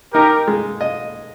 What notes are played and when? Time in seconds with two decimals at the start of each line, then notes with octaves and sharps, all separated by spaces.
0.14 D#4 G4 A#4
0.48 G#3
0.81 D#5